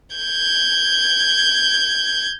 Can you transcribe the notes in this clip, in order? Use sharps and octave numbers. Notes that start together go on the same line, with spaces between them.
G6 G#6